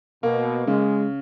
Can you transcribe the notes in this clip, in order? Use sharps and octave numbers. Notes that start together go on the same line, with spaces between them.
B2 A#3
C#3 G#3